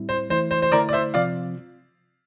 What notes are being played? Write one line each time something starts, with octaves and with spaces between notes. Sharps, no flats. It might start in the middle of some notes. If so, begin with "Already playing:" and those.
Already playing: A2 G3 C4 E4
C5
E3 A3 E4 C5
C5
C5
D3 A3 E4 A#4 D5
D5
C5 E5
C3 F3 C4 F4 D5 F5